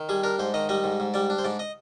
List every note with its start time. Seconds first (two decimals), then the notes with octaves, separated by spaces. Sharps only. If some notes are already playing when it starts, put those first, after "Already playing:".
Already playing: D#3
0.09 G3 G#4
0.24 D4 A#4
0.39 G#2 C5
0.54 D#3 D#5
0.69 G3 D#5
0.84 G#2
1.00 G#2
1.14 G3 D5
1.30 D4
1.38 C5
1.45 G#2 D5
1.59 D#5